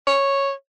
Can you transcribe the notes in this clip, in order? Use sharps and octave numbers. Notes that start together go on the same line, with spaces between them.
C#5